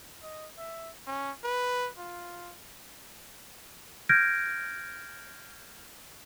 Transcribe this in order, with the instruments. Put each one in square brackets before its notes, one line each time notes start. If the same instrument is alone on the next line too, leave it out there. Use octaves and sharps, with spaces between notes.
[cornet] D#5
E5
C#4
B4
F4
[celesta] F6 G6 G#6 A#6 D7